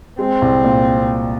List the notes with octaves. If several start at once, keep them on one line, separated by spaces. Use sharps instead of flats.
G#3 C4
C2
A#2